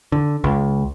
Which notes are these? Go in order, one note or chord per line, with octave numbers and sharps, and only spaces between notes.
D3
C#2